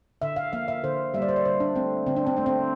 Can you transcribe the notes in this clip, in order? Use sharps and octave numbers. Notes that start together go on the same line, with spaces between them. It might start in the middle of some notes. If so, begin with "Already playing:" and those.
D3 E5
F5
F3 A#3 F5
E5
D3 C5
G3 A#3 D5 E5
C5
D5
D3 C5
D4
A3 C4
D3 C4
D4
C4
A3 D4
C4